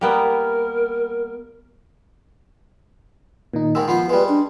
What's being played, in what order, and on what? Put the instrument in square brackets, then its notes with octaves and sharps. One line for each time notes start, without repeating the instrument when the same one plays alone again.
[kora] G3 A#3 B3 [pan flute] A#4
[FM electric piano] A#2 D#3 D#4
[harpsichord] G#2 D#3 G#3 [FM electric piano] E6
[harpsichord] F3 B3 C5 [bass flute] F4 [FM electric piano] C6
[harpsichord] G3 G#3 [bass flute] B4
[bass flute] D4